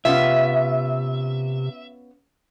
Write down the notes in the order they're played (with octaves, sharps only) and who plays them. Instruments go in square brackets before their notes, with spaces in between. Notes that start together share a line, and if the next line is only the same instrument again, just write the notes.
[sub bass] C3 [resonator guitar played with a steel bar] B3 C#4 F4 [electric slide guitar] E5